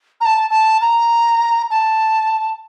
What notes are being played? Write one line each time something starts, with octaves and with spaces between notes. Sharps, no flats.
A#5
A5
A5
A#5
A5